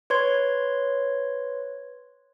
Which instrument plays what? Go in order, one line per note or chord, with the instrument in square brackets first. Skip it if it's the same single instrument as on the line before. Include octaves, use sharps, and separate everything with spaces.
[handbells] B4 C#5 C6 G#6